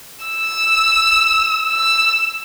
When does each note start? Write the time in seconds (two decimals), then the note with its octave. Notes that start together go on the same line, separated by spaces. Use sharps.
0.25 E6
1.68 E6